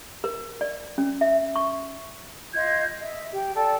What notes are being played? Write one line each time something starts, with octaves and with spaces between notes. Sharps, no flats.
A#4
D5
C#4
E5
C#6
F4 D#5 G6 G#6
D#5 E5
G4
A4 D5 G5 A5